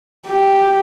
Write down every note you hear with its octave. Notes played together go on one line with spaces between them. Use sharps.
G4